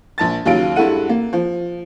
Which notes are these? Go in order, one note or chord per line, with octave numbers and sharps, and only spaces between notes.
A#1 A5 A6
D#2 C#3 F#3 F4 F5 D7
G2 G#3 E4 A4 F#5 D#7
A#3
F3